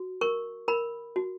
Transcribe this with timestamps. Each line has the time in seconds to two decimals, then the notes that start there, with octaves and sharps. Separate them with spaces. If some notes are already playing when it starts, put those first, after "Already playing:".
Already playing: F#4
0.21 A#4 C#6
0.68 A#4 B5
1.16 F#4